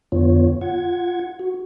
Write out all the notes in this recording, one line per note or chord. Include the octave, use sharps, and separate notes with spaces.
F2 D3 B3 F4 C#5
F4 F#5 G#6
F#4